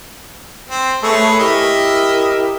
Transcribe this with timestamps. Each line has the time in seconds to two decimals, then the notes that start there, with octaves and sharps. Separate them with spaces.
0.70 C4
1.03 A3 G#4 B4 C#5
1.39 E4 G4 A#4 D#5 E5